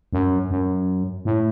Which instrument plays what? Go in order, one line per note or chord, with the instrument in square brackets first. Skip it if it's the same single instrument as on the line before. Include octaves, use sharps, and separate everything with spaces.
[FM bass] F#2
F#2
A2